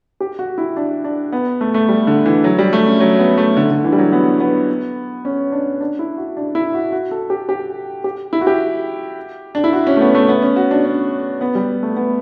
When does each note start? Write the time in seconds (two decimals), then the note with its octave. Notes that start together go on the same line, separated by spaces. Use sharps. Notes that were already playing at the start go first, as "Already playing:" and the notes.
0.20 G4
0.39 F#4
0.58 E4
0.77 D4
1.04 D4
1.32 B3
1.61 A3
1.74 A3
1.89 G3
2.07 D3
2.26 E3
2.44 F#3
2.59 G3
2.73 A3
2.86 C#4
3.00 F#3
3.19 B3
3.38 A3
3.57 D3
3.71 D3
3.84 E3
3.92 G3
3.98 F#3
4.12 B3
4.40 B3
5.25 C#4
5.52 D4
5.81 D4
5.99 E4
6.18 F#4
6.37 D4
6.55 E4
6.74 F#4
6.92 F#4
7.11 A4
7.30 G4
7.49 G4
8.04 G4
8.33 E4
8.41 F#4
8.47 G4
9.55 D4
9.64 E4
9.73 F#4
9.87 C#4
9.97 A3
10.01 B3
10.15 A3
10.29 B3
10.43 C#4
10.56 F#4
10.71 D4
10.85 C#4
11.41 B3
11.55 G3
11.83 A3
11.97 B3